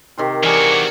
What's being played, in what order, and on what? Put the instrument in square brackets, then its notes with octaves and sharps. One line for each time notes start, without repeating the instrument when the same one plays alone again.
[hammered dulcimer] C3 D#3 C5
[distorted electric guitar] E3 F#4 [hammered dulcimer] G#4 A#4 D5